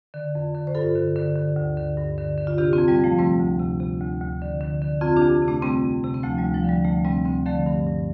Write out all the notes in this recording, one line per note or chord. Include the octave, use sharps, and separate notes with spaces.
D3
F2
D3
C5
G2 F4 A4
D3
D3
D3
D2
D3
G2
D3
D3
F4
C3 D4 G4
C4 F4
F2
G3 C4
F2
F3 A3
C3 G3 C4
D2
C3
C3
D2
D2
D3
D3
D3
F2 C4 F4
D4 G4
F2
C3
A3 D4
C3 G3 C4
F2
C3
C4
D2 F3 A3
G3
D2
F3
D3 G3
D2 F3 A3
C3 G3 C4
D2 G3 C4
D3 F3 A3
G2
G2